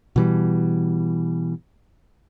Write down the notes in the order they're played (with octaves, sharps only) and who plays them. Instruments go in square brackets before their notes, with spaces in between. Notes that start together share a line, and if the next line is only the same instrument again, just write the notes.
[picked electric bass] B2 E3 G3